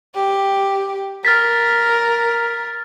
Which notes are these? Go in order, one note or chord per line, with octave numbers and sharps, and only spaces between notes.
G4
A#4 F6 A6 B6